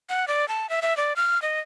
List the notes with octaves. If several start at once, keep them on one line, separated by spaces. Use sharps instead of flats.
F#5
D5
A5
E5
E5
D5
F6
D#5